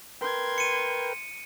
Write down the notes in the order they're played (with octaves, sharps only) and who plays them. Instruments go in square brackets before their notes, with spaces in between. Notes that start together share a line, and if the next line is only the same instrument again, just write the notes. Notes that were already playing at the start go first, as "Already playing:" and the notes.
[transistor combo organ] A#4 B4 G5 [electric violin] C6 G#6
[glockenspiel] C#7 D#7